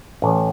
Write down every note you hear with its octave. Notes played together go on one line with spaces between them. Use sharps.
A1